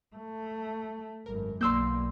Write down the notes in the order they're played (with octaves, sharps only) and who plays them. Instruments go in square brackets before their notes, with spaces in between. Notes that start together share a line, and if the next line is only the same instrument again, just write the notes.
[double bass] A3
[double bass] G#1 F#2 [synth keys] A#4
[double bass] B1 [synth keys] A#3 D5 [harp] C6 E6 G6